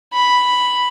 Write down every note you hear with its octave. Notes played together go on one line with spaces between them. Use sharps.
B5